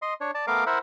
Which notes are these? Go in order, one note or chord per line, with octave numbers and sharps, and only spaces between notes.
D#5 C6
D4 C#5
D5 A5
A3 B3 A#4 F5 D6
E4 A#4 C5 E5 F#5